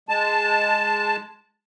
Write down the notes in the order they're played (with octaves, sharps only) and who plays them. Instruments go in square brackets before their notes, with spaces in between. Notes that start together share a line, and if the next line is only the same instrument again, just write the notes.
[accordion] G#3 A5